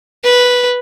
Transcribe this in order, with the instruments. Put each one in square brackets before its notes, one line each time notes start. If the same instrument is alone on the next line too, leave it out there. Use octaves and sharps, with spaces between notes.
[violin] B4